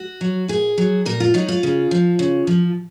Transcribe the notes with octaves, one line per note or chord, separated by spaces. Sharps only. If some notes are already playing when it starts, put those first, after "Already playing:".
Already playing: F#4
F#3
A#2 G#4
F#3
A#2 A#4
F4
F#3 D#4
F4
C#3
F3
C#3
F3